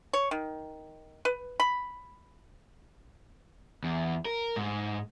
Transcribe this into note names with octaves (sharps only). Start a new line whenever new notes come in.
C#5
D#3
B4
B5
E2
A#4
G#2